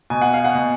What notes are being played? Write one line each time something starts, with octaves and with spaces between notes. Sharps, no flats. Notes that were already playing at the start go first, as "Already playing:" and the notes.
B2 G#5
F#5
F5
F#5
B2